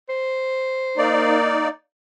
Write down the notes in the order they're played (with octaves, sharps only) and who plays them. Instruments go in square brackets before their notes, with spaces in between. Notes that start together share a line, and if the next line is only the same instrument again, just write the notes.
[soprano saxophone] C5
[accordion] A#3 D#4 D5